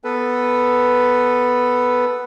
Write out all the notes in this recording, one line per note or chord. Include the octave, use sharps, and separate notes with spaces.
B3 A4 B4